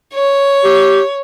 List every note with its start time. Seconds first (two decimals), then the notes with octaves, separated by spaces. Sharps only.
0.13 C#5
0.64 G4